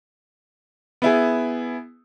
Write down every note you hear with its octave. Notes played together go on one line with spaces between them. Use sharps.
B3 E4 G#4